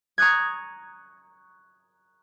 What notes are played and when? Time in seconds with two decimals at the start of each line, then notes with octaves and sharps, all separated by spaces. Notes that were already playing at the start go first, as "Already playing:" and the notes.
0.18 A#5 C#6 D#6 F#6 G#6